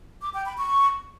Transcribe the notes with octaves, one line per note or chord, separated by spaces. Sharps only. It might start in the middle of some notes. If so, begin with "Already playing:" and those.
D6
G5
B5
C#6